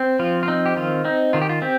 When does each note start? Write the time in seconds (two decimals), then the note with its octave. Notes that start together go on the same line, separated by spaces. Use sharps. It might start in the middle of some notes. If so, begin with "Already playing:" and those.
Already playing: C4
0.19 F3 F4
0.43 F4
0.48 C4 D#4
0.66 G4
0.77 D#3 F4
1.05 C4 D#4
1.33 D#3 F4
1.42 G4
1.49 F4
1.62 C4 G4